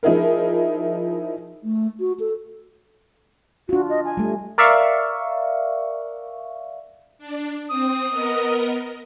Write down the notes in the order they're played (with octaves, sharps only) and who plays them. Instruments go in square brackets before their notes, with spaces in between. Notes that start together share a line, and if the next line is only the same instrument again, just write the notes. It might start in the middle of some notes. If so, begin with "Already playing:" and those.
[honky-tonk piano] F3 D#4 E4 G#4 A#4
[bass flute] A3
F#4
A4
[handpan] D4 F4 [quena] F#4
[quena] D#5
G#5
[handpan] G3 A3
[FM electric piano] A#4 D5 E5 F5 C#6
[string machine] D4
[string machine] C4 [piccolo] D#6
[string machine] B3 A#4 D#5